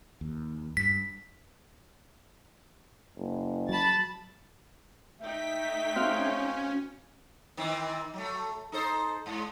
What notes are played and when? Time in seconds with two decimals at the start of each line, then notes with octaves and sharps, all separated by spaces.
0.21 D#2
0.77 G2 B6
3.17 F#1
3.69 F#3 A5 B5 A6
5.22 A3 D#4 E5 G5 B6
5.96 C4 C#4 F#4 F5
7.57 D#3 E3 C4
8.14 F#3 A3
8.72 D#4 A4 C5
9.26 G#2